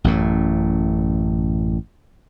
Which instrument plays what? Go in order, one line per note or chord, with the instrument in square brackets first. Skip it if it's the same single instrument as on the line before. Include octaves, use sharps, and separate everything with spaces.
[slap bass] A1 F#2 A2